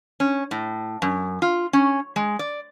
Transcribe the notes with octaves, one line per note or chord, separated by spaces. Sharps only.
C#4
A2
F#2
F4
C#4
G#3
D5